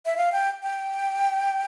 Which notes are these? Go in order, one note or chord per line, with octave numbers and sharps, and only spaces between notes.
E5
F5
G5
G5